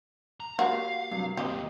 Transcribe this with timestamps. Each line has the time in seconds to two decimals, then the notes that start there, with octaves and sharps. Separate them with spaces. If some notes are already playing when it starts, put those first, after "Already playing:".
0.40 A#5
0.59 A#3 F#4 G4 F5
1.11 G2 C3 F#3
1.37 D#2 A#2 C4 G4 D#5